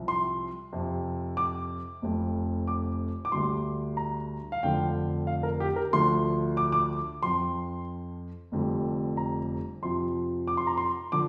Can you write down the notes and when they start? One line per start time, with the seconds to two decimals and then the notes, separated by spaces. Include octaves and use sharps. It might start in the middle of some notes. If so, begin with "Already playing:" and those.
Already playing: C2 C3 F3
0.08 C6
0.73 F2 C3 F3
1.37 D6
2.02 F1 F2 F3
2.67 D6
3.25 D6
3.32 D2 D3 G3 C6
3.97 A#5
4.52 F5
4.63 F1 F2 D3 F3 G5
5.27 F5
5.43 A#4
5.60 G4
5.76 A#4
5.93 D2 D3 F3 C6
6.57 D6
6.72 D6
7.23 F2 F3 C6
8.52 F1 F2 D3 G3
9.17 A#5
9.83 F2 C3 F3 C6
10.48 D6
10.57 C6
10.67 A#5
10.77 C6
11.12 D3 F3 D6